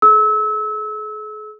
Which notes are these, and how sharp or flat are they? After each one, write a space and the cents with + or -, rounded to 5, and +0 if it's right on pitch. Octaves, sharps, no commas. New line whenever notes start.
G#4 +45 E6 -30